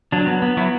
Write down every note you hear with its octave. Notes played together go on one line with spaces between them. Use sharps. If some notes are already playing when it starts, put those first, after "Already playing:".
F#3 D4
B3
B3
F#3 E4